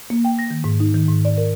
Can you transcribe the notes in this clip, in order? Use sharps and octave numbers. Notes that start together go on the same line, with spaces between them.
A#3
G5
A#6
D#3
G#2
D#4
D#3
G#2
D5
A#4